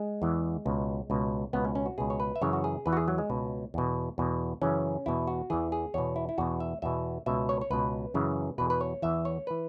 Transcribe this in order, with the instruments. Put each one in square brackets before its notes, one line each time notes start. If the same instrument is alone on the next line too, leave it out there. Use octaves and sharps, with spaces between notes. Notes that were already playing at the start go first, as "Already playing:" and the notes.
Already playing: [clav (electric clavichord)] G#3
E2 E3
C#2 B2
C#2 B2
C#2 B2 B3
C#4
C#4
F#4
C#2 B2 G#4
C#5
B4
E5
F#2 C#3 E3 C#5
F#4
G#4
E2 E3 B4
F#4
G#4
F#3
G#3
C#2 B2
E2 B2
E2 B2
F#2 C#3 E3 C#4
E2 B2 E4
F#4
E2 E3 G#4
G#4
E2 B2 C#5
E4
E4
E2 B2 F#4
E5
E2 B2 E5
C#2 B2 E5
C#5
C#5
C#2 B2 B4
F#2 C#3 E3
E2 B2 B4
B4
C#5
E2 E3 E5
C#5
E3 B4